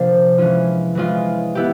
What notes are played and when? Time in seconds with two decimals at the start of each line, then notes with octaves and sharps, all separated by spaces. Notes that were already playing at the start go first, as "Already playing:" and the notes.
Already playing: C3 F3 A#3 D4
0.38 E3 G#3 C#4 F4
0.95 E3 G#3 C#4 F4
1.55 B3 E4 G4